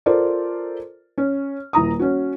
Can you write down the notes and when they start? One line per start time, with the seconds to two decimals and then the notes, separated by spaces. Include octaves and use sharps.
0.06 F4 A4 A#4 C5 D5
1.18 C#4
1.73 D#1 E4 A#5 D#6
1.99 C#4 F#4